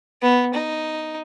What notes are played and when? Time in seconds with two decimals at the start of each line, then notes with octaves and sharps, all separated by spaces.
0.22 B3
0.54 D#4